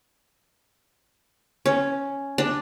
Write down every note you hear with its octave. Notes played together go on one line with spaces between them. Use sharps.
C#4
D4